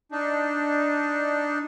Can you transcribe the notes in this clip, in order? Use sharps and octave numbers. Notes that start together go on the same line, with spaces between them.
D4 D#4